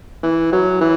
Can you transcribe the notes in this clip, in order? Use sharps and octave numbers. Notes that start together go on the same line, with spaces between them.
E3
F#3
E3